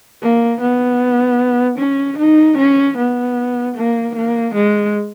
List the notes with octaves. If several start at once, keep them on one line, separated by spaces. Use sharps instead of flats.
A#3
B3
C#4
D#4
C#4
B3
A#3
A#3
G#3